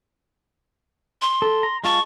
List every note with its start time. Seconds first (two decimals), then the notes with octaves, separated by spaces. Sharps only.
1.22 C6
1.42 A4
1.63 A#5
1.84 G#3 F4 A5 C#6